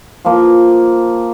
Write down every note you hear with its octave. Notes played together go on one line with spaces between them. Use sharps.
F3 A#3